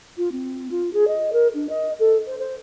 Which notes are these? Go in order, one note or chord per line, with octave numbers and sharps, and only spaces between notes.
F4
C4
F4
G#4
D#5
A#4
D4
D#5
A4
C5
C5